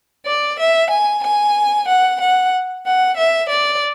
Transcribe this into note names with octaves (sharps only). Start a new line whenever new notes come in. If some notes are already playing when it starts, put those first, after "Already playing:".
D5
E5
G#5
G#5
F#5
F#5
F#5
E5
D5